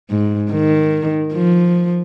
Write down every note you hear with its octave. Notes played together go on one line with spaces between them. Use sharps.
G#2
D#3
F3